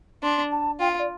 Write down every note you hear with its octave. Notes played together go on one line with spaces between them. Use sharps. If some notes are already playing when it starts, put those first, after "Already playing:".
D4 C6
A5
F4 G5
F5
D5